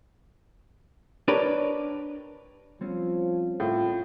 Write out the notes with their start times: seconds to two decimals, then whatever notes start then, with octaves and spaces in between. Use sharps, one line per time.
1.28 D4 G4 A#4 B4 C#5 D5
2.81 F3 G3 C4 C#4
3.60 A2 F4